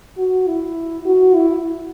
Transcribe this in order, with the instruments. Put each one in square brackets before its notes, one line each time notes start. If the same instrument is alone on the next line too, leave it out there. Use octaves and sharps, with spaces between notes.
[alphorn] F#4
E4
F#4
E4